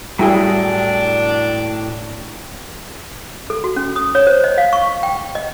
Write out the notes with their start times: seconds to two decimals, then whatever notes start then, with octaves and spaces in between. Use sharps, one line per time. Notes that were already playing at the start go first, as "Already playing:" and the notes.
0.19 A2 F#3 G3 D4 E4 G#4 G5
3.50 A4
3.64 F#4
3.76 C#4
3.96 D#6
4.15 C#5
4.27 C5
4.44 D#5
4.58 F5
4.73 C#6
5.03 G5
5.35 D#5